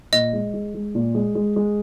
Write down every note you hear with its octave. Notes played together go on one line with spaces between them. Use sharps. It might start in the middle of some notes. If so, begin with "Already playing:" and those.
A#2 D#5
G#3
G#3
G#3
A#2
G#3
G#3
G#3